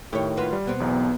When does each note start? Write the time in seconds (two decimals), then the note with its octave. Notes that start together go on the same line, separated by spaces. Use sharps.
0.13 A2 D#3 G4 C#5
0.37 F4 F#4 B4
0.52 G3
0.66 B2 B3 C4
0.80 B1 E2